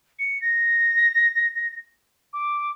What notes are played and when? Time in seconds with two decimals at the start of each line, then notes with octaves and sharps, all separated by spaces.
0.19 C#7
0.42 A#6
2.33 D6